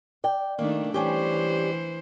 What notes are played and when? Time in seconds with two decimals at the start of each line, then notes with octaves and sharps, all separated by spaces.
0.24 D5 G5
0.59 D#3 A3 A#3 D4
0.94 E3 G3 C#4 G4 C5